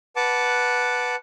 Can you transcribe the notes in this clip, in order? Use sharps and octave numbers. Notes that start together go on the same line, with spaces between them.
B4 F#5 A5 D6